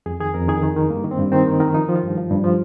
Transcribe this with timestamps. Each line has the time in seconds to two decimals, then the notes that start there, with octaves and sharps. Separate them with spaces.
0.06 F2 G#4
0.20 D#3 G#4
0.34 F2 A#4
0.48 D#3 G#4
0.63 D#3
0.76 D#3
0.90 G2 A#3
1.04 D#3
1.11 C4
1.19 G2
1.32 D#3 C4
1.47 D#3
1.60 D#3
1.74 F3 D#4
1.89 F3
1.96 F4
2.03 G2
2.17 F3
2.31 G2
2.44 F3